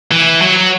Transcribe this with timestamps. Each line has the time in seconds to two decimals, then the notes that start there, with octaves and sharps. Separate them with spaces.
0.11 E3
0.41 F#3